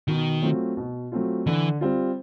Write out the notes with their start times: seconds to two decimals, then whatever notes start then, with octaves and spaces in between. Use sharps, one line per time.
0.08 B2 D#3
0.42 F#3 A3 C4 F4
0.77 B2
1.12 F#3 A3 C4 F4
1.47 D3 E3
1.81 G3 C4 F4